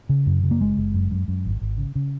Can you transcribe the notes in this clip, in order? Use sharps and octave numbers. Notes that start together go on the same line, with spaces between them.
C#3
F#2
C#3
A#3
F#1 G#3
F#1
F#2
F#2
F#2
G#1
G#1
C#3
C#3